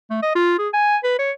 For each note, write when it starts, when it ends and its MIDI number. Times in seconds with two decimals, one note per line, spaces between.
0.10 0.19 57
0.23 0.33 75
0.35 0.57 65
0.58 0.68 68
0.73 0.97 80
1.03 1.15 71
1.19 1.31 73